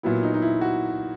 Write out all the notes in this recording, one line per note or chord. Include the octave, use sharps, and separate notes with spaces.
A#2 F#3 B3 E4
D#4
D#4
E4
F#4